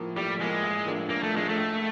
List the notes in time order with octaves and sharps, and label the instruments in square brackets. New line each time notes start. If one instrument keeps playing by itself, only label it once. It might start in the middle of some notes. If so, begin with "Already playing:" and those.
Already playing: [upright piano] A2 F3 A#3
[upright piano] A2 [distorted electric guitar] G3
[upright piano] F3 A#3 [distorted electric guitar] G#3
[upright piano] A1
A2 F3 A#3 D4
[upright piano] A1 [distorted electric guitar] A#3
[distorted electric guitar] A3
[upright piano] A2 F3 A#3 D4 [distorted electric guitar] G#3
[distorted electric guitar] A3
[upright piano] C#2